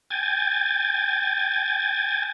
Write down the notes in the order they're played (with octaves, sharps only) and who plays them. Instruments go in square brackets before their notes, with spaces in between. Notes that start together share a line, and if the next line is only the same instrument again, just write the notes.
[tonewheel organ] G5 G#5 G#6 A6